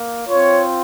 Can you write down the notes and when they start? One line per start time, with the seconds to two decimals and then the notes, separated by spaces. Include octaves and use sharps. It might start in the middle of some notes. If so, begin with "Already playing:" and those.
Already playing: A#3
0.28 C4 F4 C#5